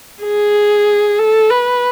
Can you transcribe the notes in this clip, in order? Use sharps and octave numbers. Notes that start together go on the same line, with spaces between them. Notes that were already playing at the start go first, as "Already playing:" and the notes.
G#4
A4
B4